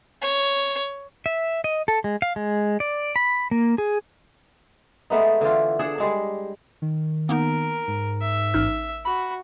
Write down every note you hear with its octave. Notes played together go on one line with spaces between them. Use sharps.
C#5
E5
D#5
A4
G#3
F5
G#3
D5
B5
A#3
G#4
G#3 A3 B3 D#4
D3 E3 F4
D4 G#4 A4 F#5
G3 G#3 D4
D#3
A#3 B3 D#4 A#4
G#2
E5
A1 D#4 F6
F#4 B5